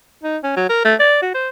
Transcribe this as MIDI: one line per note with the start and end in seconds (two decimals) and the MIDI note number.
0.24 0.38 63
0.44 0.56 61
0.56 0.66 54
0.69 0.82 70
0.85 0.95 57
1.00 1.21 74
1.22 1.31 66
1.35 1.49 72